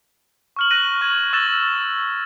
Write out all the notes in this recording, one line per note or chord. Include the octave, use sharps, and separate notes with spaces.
C#6 F6 F#7
F#6 A#6 D#7 F#7
C#6 G#6
C#6 E6 F#6 A6 E7 F#7